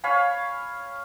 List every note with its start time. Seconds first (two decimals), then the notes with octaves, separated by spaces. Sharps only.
0.04 C#5 F5 G#5 B5